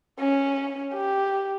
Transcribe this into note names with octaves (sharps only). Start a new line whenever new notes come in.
C#4
G4